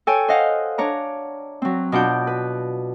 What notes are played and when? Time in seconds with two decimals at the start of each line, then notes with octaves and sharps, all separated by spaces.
0.07 A4 C#5 G5 G#5
0.28 C5 D#5 F5 F#5
0.78 D4 C#5 A#5
1.62 F#3 C4
1.92 B2 D4 F4 F#5 G6
2.27 B4